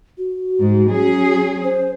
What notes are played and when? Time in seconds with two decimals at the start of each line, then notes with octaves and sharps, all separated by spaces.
0.18 F#4
0.61 G#2
0.90 F#3 C#4 G#4
1.64 C5